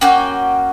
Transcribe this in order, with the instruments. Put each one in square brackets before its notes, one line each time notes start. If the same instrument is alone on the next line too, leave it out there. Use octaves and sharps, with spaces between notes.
[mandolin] A#3 C#4 F#4 G5